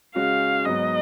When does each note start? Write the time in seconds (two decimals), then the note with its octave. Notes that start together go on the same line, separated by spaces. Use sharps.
0.15 C#3 G#3 C#4 F#4 F5
0.65 G#2 F#3 B3 D#5